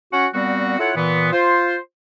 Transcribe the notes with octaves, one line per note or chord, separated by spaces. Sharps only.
C#4 F#4 F#5
A#2 G3 B3 C4 F#4
E4 F4 A4 C#5 F#5
A#2 E3 B3
F4 C5